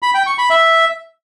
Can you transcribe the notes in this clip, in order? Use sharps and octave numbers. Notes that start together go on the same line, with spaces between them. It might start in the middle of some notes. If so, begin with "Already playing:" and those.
B5
G5
C#6
B5
E5